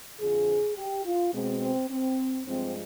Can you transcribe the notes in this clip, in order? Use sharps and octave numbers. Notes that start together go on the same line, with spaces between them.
F2 D3 F3 G#4
G4
F4
B2 G#3 C4
C4
C4
G2 F3 G#3 C4